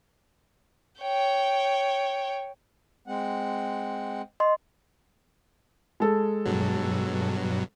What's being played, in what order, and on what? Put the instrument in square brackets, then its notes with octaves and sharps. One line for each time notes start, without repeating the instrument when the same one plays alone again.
[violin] C#5 G5
[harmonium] G#3 C4 F#5
[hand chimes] D#5 C6
[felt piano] G#3 A4
[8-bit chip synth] G2 B2 F#3